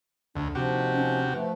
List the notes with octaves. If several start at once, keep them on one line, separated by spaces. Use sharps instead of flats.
D2 D4
D#2 C3 F3 F#4 G4
C#4
F3 A3 B4